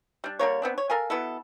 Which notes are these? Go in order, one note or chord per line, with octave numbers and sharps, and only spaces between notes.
G3 D4
D3 G3 A#3 C#5
B3 C4 D4
C#5
A4 A#4 F5 G#5
B2 B3 E4 A4